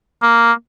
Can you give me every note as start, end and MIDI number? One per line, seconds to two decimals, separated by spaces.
0.22 0.52 58